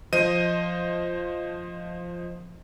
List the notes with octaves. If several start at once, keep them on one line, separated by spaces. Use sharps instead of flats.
F3 C5 D#5 D#7